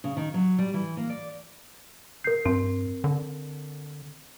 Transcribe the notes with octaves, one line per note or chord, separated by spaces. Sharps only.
C#3
D#3
F#3
G3
E3
A#3
D5
A#4 G6 C7
G2 C4
D3